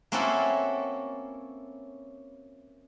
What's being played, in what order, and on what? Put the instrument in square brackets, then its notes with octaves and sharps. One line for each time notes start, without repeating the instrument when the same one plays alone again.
[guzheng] A#3 C4 C#4 E4 F#4 A4